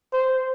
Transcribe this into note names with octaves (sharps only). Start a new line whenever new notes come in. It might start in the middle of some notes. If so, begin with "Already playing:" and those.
C5